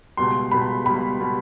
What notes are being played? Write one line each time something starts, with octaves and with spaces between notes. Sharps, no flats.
C#2 B2 G3 C6
C#2 B2 G3 B5
C#2 B2 G3 B5
B2 G3